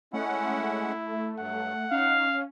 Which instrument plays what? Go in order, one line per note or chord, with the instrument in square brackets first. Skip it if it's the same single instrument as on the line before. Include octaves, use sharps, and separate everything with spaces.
[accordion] G#3 C#4 F#5 [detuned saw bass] A3 [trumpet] E4
[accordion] G2 F#3 [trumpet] F#5
[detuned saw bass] C#4 [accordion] D#4 [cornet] F5